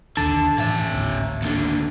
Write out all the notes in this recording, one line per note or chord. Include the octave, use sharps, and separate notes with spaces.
E1 A#1 D#2 D3 A5
A2 C#3 E3 E5
G#1 D2 A2
D#2 D3